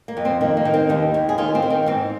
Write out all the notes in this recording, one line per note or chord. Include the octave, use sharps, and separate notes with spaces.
A#3
F2
C4
D#3 A#3
A#3
D#3
C4
D#2 D#4
D#2
G#4
D#3 F4
C4
D#3
C4
G#2 C4